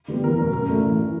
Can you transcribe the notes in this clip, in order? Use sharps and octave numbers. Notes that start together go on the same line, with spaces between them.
D3 G3 B3
E2 A#4
B2 F#3 A#4
F#2 A#4
C#3 F#3 A3 D4
A1
E3